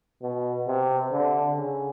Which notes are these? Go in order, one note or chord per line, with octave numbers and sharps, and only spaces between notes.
B2
C3
D3
C#3